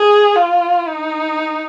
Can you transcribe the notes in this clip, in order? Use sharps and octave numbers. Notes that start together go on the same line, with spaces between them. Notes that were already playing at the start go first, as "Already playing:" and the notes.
Already playing: G#4
F4
D#4